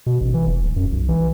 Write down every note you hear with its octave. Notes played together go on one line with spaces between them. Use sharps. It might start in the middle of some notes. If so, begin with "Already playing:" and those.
B2
A1
E3
F1
D#1
F#2
B1
E3